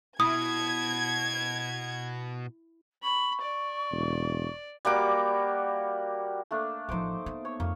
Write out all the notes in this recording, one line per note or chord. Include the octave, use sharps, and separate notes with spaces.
B2 E4 D#6 G#6
B5 C#6
D5
E1
G3 A#3 F#4 D6
A3 A#3 D4
A1 F3 D#4 C5 D6
B3
C#5
F2 A#3